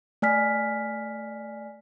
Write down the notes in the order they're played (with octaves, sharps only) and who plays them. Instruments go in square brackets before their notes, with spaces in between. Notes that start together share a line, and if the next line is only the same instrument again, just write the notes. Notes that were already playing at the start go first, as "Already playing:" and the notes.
[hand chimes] A3 D5 G#5 F6 B6